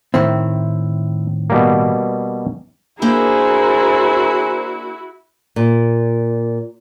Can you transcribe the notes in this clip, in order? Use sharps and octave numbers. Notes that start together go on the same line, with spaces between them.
A2 D#3 C4 E4
B2 G3 A#3
A#3 D4 E4 F#4 G#4 A#4 C5 G5
A#2